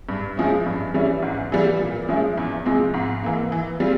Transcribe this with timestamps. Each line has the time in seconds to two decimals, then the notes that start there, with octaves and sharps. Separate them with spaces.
0.09 G2
0.37 F3 G#3 C#4 E4
0.66 G2
0.94 E3 G3 C#4 E4
1.22 G#2
1.52 E3 G3
1.81 A#2
2.09 F3 G#3 C#4 E4
2.37 E2
2.66 C3 F3 G#3 C4
2.94 G#2
3.23 E3 A#3
3.52 E3
3.80 G3 C4 F4